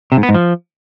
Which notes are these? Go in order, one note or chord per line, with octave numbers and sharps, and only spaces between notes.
C3
G#2
B3
G#2
F3